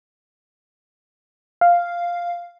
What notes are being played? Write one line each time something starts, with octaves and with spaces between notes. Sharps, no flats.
F5